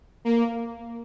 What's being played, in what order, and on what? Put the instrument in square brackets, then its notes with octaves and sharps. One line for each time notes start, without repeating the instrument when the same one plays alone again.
[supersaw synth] A#3